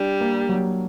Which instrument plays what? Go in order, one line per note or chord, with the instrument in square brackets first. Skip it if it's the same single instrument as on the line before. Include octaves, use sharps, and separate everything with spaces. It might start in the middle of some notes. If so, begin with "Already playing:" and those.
Already playing: [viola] G3 [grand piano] D4
[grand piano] A#3
F#3